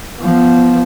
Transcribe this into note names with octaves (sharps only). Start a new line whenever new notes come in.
F3 B3